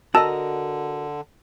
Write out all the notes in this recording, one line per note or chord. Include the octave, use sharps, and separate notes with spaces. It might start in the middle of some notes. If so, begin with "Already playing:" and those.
D3 F#4 A#4 D#5 A5 E6